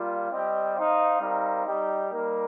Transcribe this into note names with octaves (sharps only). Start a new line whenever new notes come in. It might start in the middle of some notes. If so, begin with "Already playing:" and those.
Already playing: G3 A#3 F4
G3 C4 G4 D#5 G5
D#4 C5 F5
G3 C4 D#4 A#4 F5
G3 D#4 G4 D#5 G5
G3 A#3 D#4 A#4